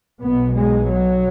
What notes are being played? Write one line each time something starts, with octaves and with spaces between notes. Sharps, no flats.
B1 B2 B3
G#3
F#3